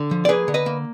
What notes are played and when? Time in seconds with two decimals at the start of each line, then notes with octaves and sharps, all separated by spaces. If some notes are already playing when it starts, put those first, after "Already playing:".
Already playing: D3
0.11 F3
0.25 D5
0.29 A#3 G#4 B4
0.48 D3
0.54 B4 D#5
0.66 A#3